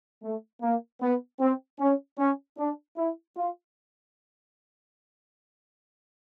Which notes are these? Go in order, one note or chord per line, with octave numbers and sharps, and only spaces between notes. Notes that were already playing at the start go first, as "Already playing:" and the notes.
A3
A#3
B3
C4
C#4
C#4
D4
E4
F4